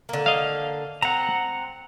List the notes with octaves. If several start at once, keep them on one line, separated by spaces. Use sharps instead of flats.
D3 A#3
D#5 F5
C4 F#5 A#5